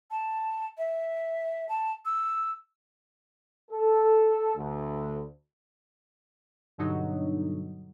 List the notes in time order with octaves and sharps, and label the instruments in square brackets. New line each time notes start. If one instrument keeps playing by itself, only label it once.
[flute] A5
E5
A5
E6
[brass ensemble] A4
D2
[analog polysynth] G2 B2 D3 F#3 D#4